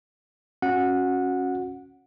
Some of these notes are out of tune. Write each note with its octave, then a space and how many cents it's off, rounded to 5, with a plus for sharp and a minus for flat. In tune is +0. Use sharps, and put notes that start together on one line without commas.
C#4 -20 F#4 -15 F#5 -15